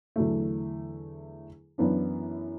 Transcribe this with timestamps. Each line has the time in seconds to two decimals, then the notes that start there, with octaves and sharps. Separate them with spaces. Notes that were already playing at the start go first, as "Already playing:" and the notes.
0.16 E2 D3 F#3 A3
1.78 F#2 E3 B3 D4